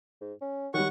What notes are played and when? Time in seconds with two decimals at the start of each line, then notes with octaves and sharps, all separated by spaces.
0.21 G#2
0.41 C#4
0.74 D#3 F#3 G3 F#5 C#6